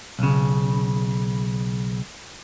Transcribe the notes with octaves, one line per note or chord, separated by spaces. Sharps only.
B1 C#3